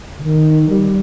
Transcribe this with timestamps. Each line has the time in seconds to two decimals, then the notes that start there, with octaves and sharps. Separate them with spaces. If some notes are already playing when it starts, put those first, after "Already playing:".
0.19 C#3
0.23 D#3
0.69 G3